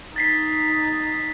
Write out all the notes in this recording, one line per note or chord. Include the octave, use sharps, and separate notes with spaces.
D#4 A6 B6 C7